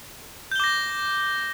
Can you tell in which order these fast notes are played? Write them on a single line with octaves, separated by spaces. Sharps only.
G6 G7 D6 A#6